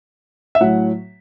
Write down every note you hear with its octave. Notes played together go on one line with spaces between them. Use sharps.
E5
A2 F#3 F#5